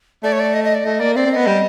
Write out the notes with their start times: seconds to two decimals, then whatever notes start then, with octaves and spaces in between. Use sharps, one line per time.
0.23 A3 D5
0.32 C#5
0.40 D5
0.54 D#5
0.64 D#5
0.75 D5
0.85 A3 D#5
1.00 A#3 D5
1.16 C4 D5
1.26 C4
1.32 B3 D#5
1.47 G3